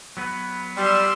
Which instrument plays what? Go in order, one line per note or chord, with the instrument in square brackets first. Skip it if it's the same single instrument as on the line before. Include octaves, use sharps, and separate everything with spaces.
[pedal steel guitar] F#3 B3 B4
[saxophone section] G3 [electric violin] C6 E6